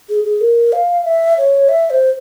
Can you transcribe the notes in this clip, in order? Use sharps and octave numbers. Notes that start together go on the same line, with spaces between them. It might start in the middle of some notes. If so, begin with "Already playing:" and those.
G#4
G#4
A#4
F5
E5
C#5
E5
C5